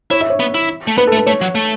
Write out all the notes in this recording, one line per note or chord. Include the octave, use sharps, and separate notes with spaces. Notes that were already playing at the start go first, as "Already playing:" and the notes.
E4 C#5
E5
C#5
B3
E4
A3
B3 B4
A4
A3
B4
A3 C#5
F#3
A3